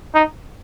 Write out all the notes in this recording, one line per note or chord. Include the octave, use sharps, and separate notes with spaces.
D#4